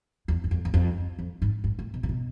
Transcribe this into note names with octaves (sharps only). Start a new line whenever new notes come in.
E2
F#2
F2
E2
F2
F2
G#2
G#2
A2
B2
C3
B2